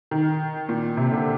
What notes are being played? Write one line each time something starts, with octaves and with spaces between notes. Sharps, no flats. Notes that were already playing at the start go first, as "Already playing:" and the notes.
D#3
A#2
C3
D3